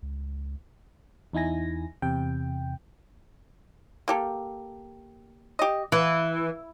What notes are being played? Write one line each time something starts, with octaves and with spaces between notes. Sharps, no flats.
C#2
E2 D#4 E4 G#5 A#6
E2 C3 G5
A#3 G4 A4
G4 D#5
E3 B4